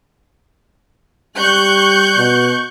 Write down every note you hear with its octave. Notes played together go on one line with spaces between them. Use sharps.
G3 C#6 F#6 G6
B2